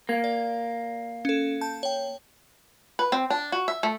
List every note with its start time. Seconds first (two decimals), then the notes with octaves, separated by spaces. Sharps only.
0.09 A#3 G#6
0.24 D5
1.25 C#4 A4
1.61 A5 G6
1.83 C#5 G5
2.99 B4
3.12 C4
3.30 D4
3.52 F#4
3.68 E5
3.83 A3